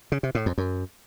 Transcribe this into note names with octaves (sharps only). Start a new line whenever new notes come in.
C#3
C3
A2
F2
F#2